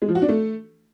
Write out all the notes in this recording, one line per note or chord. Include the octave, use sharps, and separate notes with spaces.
G#3
F3
F#4
D4
A3